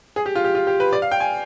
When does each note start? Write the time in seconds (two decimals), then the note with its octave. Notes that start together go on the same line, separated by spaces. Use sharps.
0.16 G#4
0.26 G4
0.35 F4
0.44 G4
0.55 F4
0.67 G4
0.80 B4
0.93 D5
1.02 F5
1.11 G5
1.20 G#5